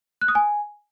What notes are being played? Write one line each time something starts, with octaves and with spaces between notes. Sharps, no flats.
F#6
D#6
G#5